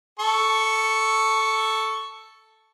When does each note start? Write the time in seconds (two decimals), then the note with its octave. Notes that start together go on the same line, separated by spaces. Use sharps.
0.20 A4 C#6